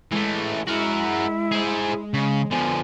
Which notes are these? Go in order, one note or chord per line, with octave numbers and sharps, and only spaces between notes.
E3 G#3 A3
E4 F#4 A#4
G#4 C5
C#3
D3 F3 B3 G#5